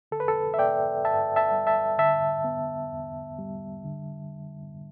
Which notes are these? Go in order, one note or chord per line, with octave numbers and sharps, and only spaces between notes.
D3 A4
B4
A4
E5
B3 D5 G5
G2 E5 A5
E5 A5
G3
E5 A5
D3 E5 A5
B3
E2
G3
D3